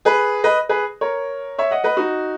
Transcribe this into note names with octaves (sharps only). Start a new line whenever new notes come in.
G#4 B4
B4 D#5
G#4 B4
A#4 C#5
C#5 E5
D#5 F#5
B4 D#5
D#4 F#4